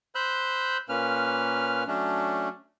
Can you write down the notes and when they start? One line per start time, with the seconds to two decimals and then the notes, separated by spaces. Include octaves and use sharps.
0.15 C5 B5 E6 F#6 G6
0.89 A#2 A#3 C#4 B4 F6
1.88 F#3 A3 C#4 D4